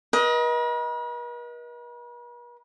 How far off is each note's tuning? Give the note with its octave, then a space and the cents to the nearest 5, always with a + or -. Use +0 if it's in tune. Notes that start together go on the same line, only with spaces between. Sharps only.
B4 -45 D#5 +20